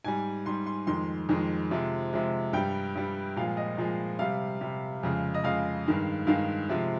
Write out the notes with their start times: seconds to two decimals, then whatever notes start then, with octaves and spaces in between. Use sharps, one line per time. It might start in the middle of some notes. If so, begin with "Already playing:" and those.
0.04 G#2 G3 G#5
0.46 G#2 G3 C6
0.66 C6
0.87 F2 D#3 G#3 C6
1.29 F2 D#3 G#3
1.71 C3 F3 G#3
2.13 C3 F3 G#3
2.53 G2 G3 G5
2.95 G2 G3
3.36 A#2 F3 G#3 F5
3.57 D#5
3.77 A#2 F3 G#3
4.19 C3 G3 F5
4.61 C3 G3
5.03 F2 C#3 G#3
5.34 D#5
5.44 F2 C#3 G#3 F5
5.86 G2 D#3 G#3
6.27 G2 D#3 G#3 F5
6.69 C3 F3 G#3